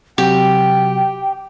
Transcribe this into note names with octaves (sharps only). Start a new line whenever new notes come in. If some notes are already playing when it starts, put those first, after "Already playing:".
C3 F#3 F#4 G4 G5